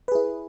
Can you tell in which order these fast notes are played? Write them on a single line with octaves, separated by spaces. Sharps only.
B4 G#4 E4